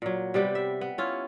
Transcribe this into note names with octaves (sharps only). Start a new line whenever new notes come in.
A#2 F#3
C3 G3 B3 G4
E5
B3
C#4 E4 F4